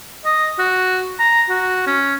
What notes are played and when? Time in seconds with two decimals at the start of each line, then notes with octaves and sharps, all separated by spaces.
0.25 D#5
0.59 F#4
1.20 A#5
1.50 F#4
1.87 C#4